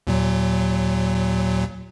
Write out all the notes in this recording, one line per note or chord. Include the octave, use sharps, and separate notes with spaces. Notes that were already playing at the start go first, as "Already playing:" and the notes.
D#2 A#2 F#3